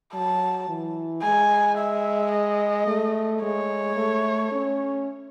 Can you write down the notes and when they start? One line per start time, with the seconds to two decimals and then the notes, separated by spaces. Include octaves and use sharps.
0.13 F#3 A5
0.69 E3
1.23 G#3 G#5
1.78 E5
2.32 D#5
2.87 A3
3.42 G#3 C#5
3.97 A3
4.52 C#4